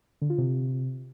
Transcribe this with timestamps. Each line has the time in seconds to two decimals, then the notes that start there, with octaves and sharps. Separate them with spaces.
0.21 D3
0.30 F4
0.38 C3